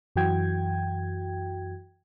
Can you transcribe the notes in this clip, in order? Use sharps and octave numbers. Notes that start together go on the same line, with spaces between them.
F#2 E3 F#4 G5 G#6